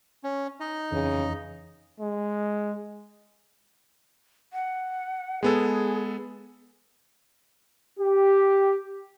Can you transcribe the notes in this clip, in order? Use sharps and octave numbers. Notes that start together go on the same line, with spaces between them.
C#4
D#4 D#5
F2 C#3 E3
G#3
F#5
G#3 B3 G#4 A4
G4